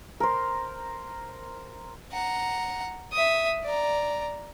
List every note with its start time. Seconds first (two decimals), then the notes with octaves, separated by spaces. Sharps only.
0.20 A#4 C5
2.12 F#5 A#5
3.12 E5 D#6
3.64 D5 A#5